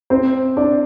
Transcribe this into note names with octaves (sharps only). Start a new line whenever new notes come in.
C4 C5
D4 D5